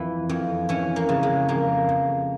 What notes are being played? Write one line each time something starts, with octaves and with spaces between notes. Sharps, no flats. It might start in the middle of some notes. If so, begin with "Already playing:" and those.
Already playing: F2 E3
F2
E3 C#4
A#3
C#3
G#3
F2 A#3
F2